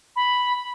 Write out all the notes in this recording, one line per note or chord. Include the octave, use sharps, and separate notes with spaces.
B5